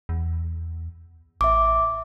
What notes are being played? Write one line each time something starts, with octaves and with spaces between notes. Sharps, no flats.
E2
A1 E5 D6